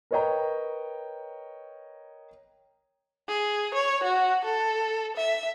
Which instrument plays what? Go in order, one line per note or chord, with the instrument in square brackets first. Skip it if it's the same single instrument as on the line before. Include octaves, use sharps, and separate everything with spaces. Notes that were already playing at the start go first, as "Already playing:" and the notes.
[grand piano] A#4 B4 C#5 D#5 G5 A#5
[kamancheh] G#4
C#5
F#4
A4
E5